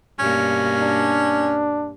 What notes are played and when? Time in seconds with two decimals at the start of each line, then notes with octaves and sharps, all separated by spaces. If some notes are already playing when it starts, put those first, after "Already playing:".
0.19 G2 B2 A#3 C#4
0.80 D4